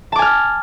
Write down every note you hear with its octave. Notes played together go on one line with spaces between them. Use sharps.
G#5 A5 D6 F6